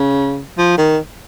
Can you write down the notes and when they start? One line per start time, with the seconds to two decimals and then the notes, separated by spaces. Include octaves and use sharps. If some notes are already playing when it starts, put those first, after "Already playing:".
Already playing: C#3
0.58 F3
0.78 D#3